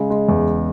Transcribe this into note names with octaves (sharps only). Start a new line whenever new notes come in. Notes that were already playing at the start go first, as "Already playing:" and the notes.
Already playing: C#3 G#3
G#3
E2